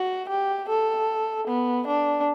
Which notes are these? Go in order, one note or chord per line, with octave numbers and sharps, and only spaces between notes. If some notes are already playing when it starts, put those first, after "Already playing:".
Already playing: F#4
G4
A4
B3
D4